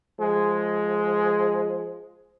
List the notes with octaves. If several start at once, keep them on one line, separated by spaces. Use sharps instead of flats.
F3 G#3